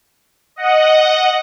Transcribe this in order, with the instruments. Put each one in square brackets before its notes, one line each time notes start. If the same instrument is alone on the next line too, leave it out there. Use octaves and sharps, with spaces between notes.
[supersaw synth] D#5 F#5